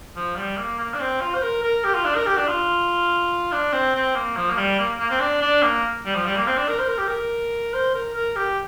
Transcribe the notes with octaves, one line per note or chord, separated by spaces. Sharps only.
F3
G3
A#3
A#3
D4
C4
F4
C5
A#4
A#4
G4
F4
D4
A#4
G4
D4
F4
D4
C4
C4
A#3
F3
A#3
G3
A#3
A#3
C4
D4
D4
A#3
G3
F3
G3
A#3
C4
D4
A#4
C5
A#4
G4
A#4
C5
A#4
A#4
G4